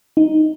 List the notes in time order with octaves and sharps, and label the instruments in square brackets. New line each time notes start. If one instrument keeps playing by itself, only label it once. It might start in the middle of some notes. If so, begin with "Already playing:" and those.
[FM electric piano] D#4